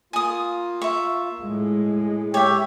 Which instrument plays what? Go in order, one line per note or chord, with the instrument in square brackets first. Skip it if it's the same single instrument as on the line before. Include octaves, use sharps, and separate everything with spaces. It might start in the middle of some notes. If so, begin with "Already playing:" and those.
[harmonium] A#3 F4 [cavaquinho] G#5 D#6
[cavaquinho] E5 C#6
[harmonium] A2 [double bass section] G#3
[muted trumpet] G4 [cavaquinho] C#5 E5